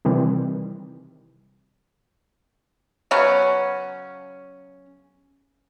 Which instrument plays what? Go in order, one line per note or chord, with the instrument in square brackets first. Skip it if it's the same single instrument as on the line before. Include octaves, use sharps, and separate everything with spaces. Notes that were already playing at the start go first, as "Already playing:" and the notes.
[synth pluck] C3 D#3 E3 G3 C4
[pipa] C#3 F#3 B3 C#4